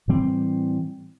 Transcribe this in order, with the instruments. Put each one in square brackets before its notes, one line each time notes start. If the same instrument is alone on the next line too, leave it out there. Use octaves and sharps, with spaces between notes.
[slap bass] A2 E3 G3 C4